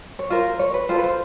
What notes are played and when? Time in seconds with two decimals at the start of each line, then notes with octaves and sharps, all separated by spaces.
0.19 C#5
0.30 F4 A#4 C5
0.59 C#5
0.74 B4
0.89 F4 A4 C5
0.98 B4
1.04 C5